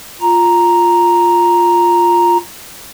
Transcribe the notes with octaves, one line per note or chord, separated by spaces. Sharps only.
F4 A#5